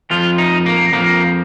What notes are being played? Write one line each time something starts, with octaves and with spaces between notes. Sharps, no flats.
F2 F3 F4
D#4
A#3
F2 F3 A#3